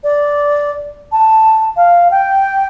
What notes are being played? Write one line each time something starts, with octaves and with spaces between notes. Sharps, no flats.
D5
A5
F5
G5